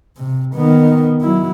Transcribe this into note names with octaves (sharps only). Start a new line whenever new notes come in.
C3
D#3 B3
F#3 E4